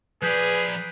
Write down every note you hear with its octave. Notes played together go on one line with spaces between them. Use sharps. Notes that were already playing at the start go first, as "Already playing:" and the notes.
F3 G#4 B4 D5 F#6 G6 B6